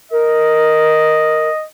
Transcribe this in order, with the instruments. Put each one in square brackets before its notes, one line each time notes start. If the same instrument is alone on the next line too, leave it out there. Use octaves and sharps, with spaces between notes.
[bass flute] A#4 [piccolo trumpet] D#5